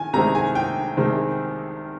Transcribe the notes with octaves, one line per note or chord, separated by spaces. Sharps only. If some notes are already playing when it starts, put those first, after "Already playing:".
Already playing: D#3 G#5
C2 C3 D#3 G#3 C4 A#5
G#5
G5
C2 C3 D#3 G#3 C4